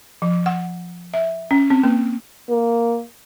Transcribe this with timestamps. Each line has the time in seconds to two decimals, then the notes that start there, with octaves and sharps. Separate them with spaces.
0.22 F3
0.46 F#5
1.14 E5
1.51 C#4
1.70 C4
1.83 A#3
2.49 A#3